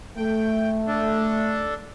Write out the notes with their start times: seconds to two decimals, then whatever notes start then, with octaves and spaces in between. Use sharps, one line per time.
0.17 A3 G5
0.87 D4 A4